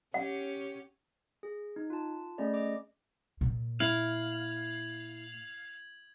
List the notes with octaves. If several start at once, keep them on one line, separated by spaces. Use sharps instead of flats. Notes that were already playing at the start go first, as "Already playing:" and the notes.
C#4 G4 C#5 F#5
G#4
D#4
F4 A5
A3 C#4 G#4 D5 D#5
D#5 D6
A#2
E4 F5 G#6 F#7